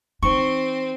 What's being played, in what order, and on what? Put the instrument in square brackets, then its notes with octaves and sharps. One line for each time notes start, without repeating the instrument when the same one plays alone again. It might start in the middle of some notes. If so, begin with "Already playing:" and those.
[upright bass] E3 D#4 [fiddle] C4 [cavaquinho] C#6